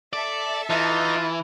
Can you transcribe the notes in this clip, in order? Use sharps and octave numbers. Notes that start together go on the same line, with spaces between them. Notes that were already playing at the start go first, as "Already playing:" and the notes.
A4 D5 E5 A5
E3 D#4 F4